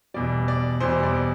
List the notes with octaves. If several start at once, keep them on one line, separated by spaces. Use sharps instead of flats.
E2 B2 G3 D5
D5
E2 B2 G3 C5
D5